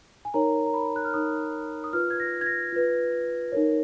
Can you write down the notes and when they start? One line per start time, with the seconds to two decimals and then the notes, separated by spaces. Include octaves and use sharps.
0.25 G#5
0.34 D#4 A#4 C#5 A#5
0.66 A#5
0.74 B5
0.96 F#6
1.05 F6
1.14 D#4 A#4 C#5 D#6
1.84 D#6
1.93 F4 B4 F6
2.10 G#6
2.20 A#6
2.41 G#6
2.46 A#6
2.72 F4 B4
3.52 D#4 A#4 C#5